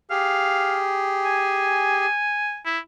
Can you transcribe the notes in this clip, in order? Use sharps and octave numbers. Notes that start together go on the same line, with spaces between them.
G4 G#4 F5
G#5
E4